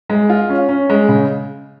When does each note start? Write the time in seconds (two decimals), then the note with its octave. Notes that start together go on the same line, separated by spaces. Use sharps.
0.10 G#3
0.30 F4
0.50 C#4
0.69 C#4
0.90 G#3
1.09 C#3